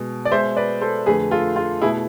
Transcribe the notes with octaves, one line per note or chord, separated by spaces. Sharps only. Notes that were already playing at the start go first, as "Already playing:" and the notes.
Already playing: B2 G#3
D5
B2 G#3 C5 E5
B4 D5
A4 C5
F2 D3 A3 G#4 B4
F4 A4
F4
B2 A3 E4 G#4